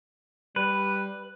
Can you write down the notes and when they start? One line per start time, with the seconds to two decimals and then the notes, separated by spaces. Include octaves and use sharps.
0.56 G3 B4